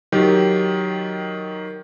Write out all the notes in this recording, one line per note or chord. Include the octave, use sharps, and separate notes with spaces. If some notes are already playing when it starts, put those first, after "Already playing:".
D#3 F#3 G4